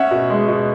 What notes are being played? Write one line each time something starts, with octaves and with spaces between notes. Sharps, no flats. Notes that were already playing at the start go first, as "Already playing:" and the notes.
Already playing: C#4 E5 F#5
B2
G#3
B2